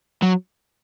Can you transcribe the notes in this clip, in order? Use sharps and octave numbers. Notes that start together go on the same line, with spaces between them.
F#3